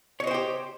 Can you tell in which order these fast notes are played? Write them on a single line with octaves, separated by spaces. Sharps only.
C#5 D#5 C5 G5 G4